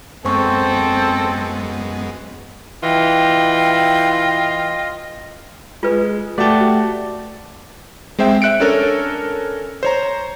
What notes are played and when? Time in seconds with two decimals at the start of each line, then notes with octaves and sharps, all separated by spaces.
0.25 F#2 G#3 B3 C4 A4 C5 C#6
2.83 E3 F4 D#5 G5
5.83 G#3 F4 B4
6.38 A3 F#4 G4 D5 A5
6.60 F#4
8.19 G#3 C4 C5 E5 G5
8.42 E5 F#6 C#7 D7
8.60 C#4 D4 A4 A#4 C#5
9.83 C5 C#5 A#5